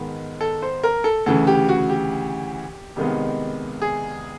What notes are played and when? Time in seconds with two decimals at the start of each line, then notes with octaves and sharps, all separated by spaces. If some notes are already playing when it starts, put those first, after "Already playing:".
Already playing: G#2 D#3 G#3 B3
0.41 A4
0.62 C5
0.83 A#4
1.04 A4
1.26 D2 C#3 E3 A4
1.47 G4
1.69 F#4
1.90 G4
2.96 C2 C3 D#3 G#3 B3
3.82 G#4